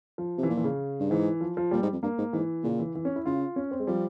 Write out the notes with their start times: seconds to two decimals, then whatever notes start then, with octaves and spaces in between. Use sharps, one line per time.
0.18 F3
0.38 C3
0.43 E3
0.49 A#2 F3
0.57 E3
0.64 C#3
1.00 G2
1.10 G#2 E3
1.41 F3
1.57 F3
1.71 A#2 G3
1.82 G#2
1.92 F2
2.03 G2 A#3
2.18 G#2
2.33 G#2 E3
2.64 A#2 C#3
2.79 E3
2.95 E3
3.05 C#4
3.16 E4
3.25 C#3 F4
3.56 C#4
3.71 C4
3.79 G#3
3.87 F3 G3